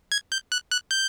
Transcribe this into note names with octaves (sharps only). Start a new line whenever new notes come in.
G#6
G6
F#6
F#6
G6